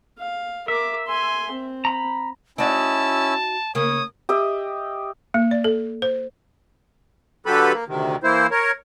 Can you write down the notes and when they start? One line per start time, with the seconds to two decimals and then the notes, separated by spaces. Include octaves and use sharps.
0.19 F5
0.68 A#4 E5 D6
1.07 G#5 C6
1.51 C4
1.85 A#5 B5
2.58 C#4 D#4 E4 F#4 D5 A5 E6
3.75 C#3 A#3 C#5 D#6
4.29 G4 D#5 E5
5.34 A#3
5.51 D5
5.64 A4
6.02 C5
7.46 D3 F#3 G4 A4 B4 B5
7.73 A#3
7.88 D2 C3 D#3
8.24 E3 A#3 E4 C5
8.51 A#4 C#5